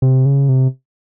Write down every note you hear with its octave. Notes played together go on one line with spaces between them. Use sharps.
C3
C#3
C3